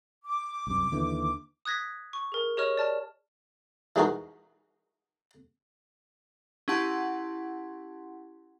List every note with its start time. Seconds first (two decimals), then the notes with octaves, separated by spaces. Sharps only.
0.25 D6
0.67 C2 F#2
0.92 D#2 D3 E3
1.65 D#6 F#6 G#6 A#6 B6
2.13 C#6
2.32 G#4 A#4
2.57 G4 G#4 C#5 D#5 C#6 F6
2.77 D5 A5 F6
3.96 E3 G#3 D#4 F#4 A#4
6.68 C#4 E4 G4 F#5 A5 C6